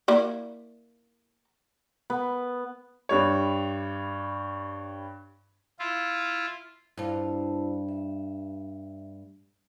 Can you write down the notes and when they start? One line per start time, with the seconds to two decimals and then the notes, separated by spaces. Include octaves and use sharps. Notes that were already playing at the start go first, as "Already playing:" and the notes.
0.08 A#3 E4 D5
2.10 B3
3.09 G2 G3 C#5
5.79 E4 F4
6.97 G2 E4 F4 C5 A5
7.89 E5